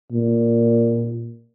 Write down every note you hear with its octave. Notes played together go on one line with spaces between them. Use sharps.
A#2